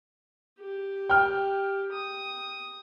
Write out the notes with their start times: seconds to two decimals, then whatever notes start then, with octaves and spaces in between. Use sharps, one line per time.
0.60 G4
1.09 G5 F6
1.92 D#6